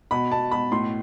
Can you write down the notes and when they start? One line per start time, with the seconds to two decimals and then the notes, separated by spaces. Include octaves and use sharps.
0.11 B2 B5
0.31 B2 A5
0.51 B2 B5
0.72 A2 C6